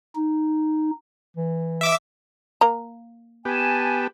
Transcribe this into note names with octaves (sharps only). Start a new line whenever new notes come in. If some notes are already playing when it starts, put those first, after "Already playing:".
D#4
E3
E5 D6 E6
A#3 A#5
B3 G4 G#5 A5